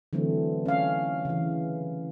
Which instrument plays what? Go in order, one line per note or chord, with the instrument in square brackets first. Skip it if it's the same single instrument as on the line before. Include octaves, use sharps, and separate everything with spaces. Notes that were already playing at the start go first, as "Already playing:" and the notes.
[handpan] D3 E3 F#3 A3 C4
C#4 F5
C#3 E3